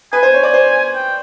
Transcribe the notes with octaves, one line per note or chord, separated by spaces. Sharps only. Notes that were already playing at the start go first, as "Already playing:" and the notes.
B4 G#5
C5
C#5
D5
C5
G5